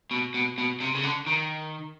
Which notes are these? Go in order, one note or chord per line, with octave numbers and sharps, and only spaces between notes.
B2
B2
B2
C3
C#3
D3
D#3